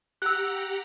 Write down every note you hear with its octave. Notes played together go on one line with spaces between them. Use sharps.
G4 F#5 A#5 E6 F#6